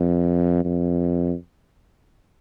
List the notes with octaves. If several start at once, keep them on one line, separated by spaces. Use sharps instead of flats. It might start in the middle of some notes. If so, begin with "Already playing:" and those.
Already playing: F2
F2